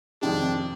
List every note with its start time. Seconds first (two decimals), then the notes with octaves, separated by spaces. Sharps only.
0.22 F2 C3 D#3 G#3 D4